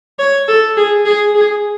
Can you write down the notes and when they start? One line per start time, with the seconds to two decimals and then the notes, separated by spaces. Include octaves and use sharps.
0.19 C#5
0.48 A4
0.77 G#4
1.05 G#4
1.35 G#4